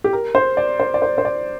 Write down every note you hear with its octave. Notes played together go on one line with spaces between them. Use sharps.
G4
A#4
C5
D5
C5
D5
C5
C5
D5